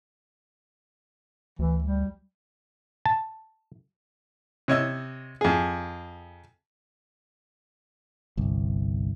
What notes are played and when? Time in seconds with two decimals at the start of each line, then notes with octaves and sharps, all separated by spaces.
1.59 D2 E3
1.82 G3
3.06 A5
4.68 C3 C#5 D#5 E6
5.41 F2 G#4
8.37 G1 C2